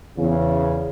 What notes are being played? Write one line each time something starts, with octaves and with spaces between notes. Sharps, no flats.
E2 C#3